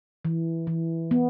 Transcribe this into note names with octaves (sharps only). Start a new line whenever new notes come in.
E3
E3
B3